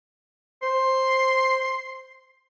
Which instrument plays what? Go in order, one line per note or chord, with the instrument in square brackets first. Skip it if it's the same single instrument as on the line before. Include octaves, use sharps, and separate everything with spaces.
[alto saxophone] C5 [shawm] C6